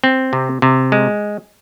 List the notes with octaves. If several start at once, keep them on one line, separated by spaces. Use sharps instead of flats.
C4
C3
C3
G#3